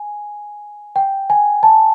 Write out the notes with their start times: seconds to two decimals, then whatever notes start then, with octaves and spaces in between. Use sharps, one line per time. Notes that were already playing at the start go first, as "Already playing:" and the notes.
Already playing: G#5
0.96 G5
1.30 G#5
1.63 A5